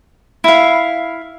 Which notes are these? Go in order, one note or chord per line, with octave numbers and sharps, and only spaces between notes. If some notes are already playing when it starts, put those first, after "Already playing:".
E4 F5